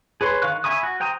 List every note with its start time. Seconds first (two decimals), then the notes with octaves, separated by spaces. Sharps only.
0.21 G#4 B4 C#5 C6
0.42 D#3 F5 C#6 F#6
0.64 E5 G#5 B5 C#6 D#6
0.83 F#4
1.00 C5 G5 A#5 D#6